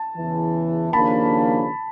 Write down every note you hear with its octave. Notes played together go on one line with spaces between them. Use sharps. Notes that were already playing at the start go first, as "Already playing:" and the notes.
Already playing: A5
E2 C#3 E3
D#2 C#3 F3 A#3 D4 A5 B5